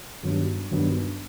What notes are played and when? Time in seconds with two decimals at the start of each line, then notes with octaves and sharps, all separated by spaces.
0.23 G2 D#3 F#3 B3 D4
0.70 G2 D#3 F#3 B3 D4